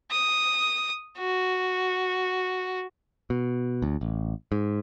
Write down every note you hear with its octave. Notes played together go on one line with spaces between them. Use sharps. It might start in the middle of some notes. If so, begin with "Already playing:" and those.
D#6
F#4
B2
D2
A1
G#2